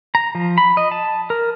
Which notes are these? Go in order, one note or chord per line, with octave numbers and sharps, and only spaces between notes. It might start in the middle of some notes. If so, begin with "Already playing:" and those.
A#5
F3
B5
D#5
A5
A#4